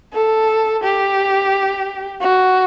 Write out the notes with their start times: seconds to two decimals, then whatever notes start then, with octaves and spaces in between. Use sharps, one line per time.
0.13 A4
0.84 G4
2.21 F#4